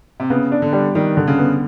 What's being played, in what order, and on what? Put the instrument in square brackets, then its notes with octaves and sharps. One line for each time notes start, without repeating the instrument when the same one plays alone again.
[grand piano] C3
[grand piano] C#3 [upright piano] B3
[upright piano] D4
[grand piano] D3
[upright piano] G3
[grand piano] D#3 [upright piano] G3
[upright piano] D3
[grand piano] C#3
[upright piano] B3